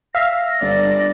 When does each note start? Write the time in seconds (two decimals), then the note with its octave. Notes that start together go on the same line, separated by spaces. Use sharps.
0.15 E5 F5 A#6
0.61 G1 D5